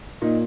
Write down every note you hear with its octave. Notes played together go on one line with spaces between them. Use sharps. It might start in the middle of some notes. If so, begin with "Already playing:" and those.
A#2 D#4